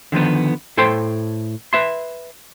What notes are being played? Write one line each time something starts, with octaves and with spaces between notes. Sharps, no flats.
D3 D#3 F3 B3
A2 A4 C5 G5 C6
B4 E5 C6